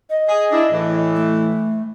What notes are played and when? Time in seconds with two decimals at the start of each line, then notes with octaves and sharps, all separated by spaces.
0.10 D#5
0.28 G#4
0.52 D4 E4
0.71 A2 E3
1.16 A3